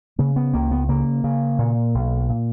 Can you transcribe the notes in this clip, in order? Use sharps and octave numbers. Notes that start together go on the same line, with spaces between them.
C#3 A#3
B3
C#2 A#3
B3
C#3 A#3
C#3
A#2
B1
A#2